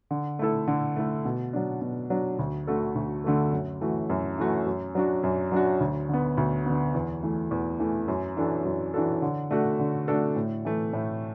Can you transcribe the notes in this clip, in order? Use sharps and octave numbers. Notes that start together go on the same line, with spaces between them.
D3
A3 E4 A4
D3
A3 E4 A4
B2
F#3 D4
B2
F#3 D4
D2
D3 A3 F#4 A4
D2
D3 A3 F#4 A4
F#2
E3 A3 F#4
F#2
E3 A3 F#4
F#2
F#3 D4 F#4
F#2
F#3 D4 F#4
D2
D3 B3
D2
D3 B3
E2
E3 A3
E2
E3 A3
F#2
E3 D4 F#4 A4
F#2
E3 D4 F#4 A4
D3
A3 D4 F#4 A4
D3
A3 D4 F#4 A4
A2
E3 A3
A2